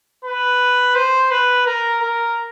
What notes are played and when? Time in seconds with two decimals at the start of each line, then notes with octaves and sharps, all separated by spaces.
0.25 B4
0.95 C5
1.31 B4
1.66 A#4
2.01 A#4